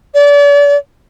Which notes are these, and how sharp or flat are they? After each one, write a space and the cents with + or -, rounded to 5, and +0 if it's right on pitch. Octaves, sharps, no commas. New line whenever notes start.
D5 -35